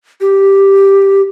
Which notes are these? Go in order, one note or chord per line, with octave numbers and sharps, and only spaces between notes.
G4